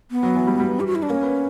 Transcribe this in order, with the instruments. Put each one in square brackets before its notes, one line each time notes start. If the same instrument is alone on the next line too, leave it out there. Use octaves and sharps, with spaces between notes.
[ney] B3
[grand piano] F#3
E3
G3
G3
[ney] G4
F#4
E4
D4
[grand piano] A#3 [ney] C#4
[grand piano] B3